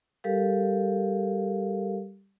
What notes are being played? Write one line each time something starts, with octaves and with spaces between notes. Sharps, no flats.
G3 G4 A4 A#4 F5